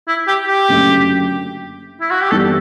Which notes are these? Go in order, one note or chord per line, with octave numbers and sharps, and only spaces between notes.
E4
G4
G4
F#1 F#2 D3 A3 C#4
E4
F#4
G4
G1 G2 E3 G3 A4